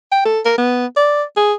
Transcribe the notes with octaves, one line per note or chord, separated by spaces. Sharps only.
G5
A4
A#4
B3
D5
G#4